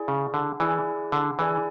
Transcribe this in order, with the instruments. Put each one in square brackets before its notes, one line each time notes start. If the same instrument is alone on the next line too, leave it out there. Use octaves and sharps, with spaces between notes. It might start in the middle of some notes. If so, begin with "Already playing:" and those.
Already playing: [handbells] E4 G#4 D5 G#5
[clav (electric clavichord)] C#3
D3
[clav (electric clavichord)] E3 [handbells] E4 G#4 D5 G#5
[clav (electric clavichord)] D3
[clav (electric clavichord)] E3 [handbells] E4 G#4 D5 G#5